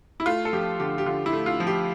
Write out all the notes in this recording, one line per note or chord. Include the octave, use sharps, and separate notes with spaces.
E4
A3 F4
A4
F3 G4
D3 G4
G4
D3 F4
E4
A3
F4
F3
G4